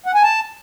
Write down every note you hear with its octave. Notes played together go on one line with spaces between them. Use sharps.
F#5
G#5
A5